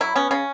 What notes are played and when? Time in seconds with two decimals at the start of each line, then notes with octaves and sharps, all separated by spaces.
0.01 F#3 E4
0.15 B3 C#4
0.31 C#3 C#4